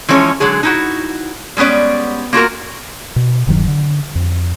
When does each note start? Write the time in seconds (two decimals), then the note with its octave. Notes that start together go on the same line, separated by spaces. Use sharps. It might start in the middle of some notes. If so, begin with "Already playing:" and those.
0.09 E3 F3 G#3 C#4 B4 C#5
0.40 D3 F#3 G#3 G#4
0.63 D#4 E4 F#4
1.57 G3 G#3 B3 C#4 D5
2.33 A#3 F4 F#4 A#4
3.16 B2
3.47 D#1 G2 D#3 F#3
3.68 D3
4.15 F2